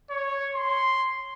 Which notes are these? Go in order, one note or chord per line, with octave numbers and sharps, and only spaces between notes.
C#5
C6